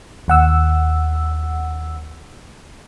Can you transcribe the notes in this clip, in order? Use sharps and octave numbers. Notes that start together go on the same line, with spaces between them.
D#2 F#5 E6